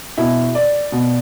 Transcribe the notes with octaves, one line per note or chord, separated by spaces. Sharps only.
B2 E4
D5
B2